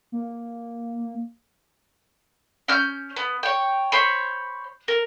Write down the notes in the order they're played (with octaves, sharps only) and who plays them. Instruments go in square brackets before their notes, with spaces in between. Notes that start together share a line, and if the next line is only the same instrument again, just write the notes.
[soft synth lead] A#3
[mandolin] C#4 F6 G6
B3
C#5 G5
C5 C#5 B5
A#4